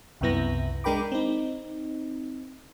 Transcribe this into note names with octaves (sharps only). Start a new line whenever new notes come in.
C2 F#2 C3 B3 E4 A#6
G#3 D4 A#4 G5 B5 D6
C4 D#4